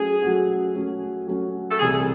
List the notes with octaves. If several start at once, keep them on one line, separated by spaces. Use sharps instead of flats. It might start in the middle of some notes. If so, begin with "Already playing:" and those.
Already playing: F#3 A3 C#4 F#4 G#4
F#3 A3 C#4 F#4
F#3 A3 C#4 F#4
F#3 A3 C#4 F#4
A4
C2 C3 E3 A3 G#4